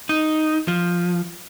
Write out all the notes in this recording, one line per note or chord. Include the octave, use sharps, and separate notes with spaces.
D#4
F3